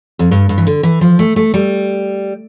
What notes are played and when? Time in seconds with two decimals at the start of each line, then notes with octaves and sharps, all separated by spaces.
0.19 F2
0.31 G2
0.49 G2
0.58 E3
0.67 D3
0.83 E3
1.01 F3
1.19 A3
1.36 A3
1.54 G3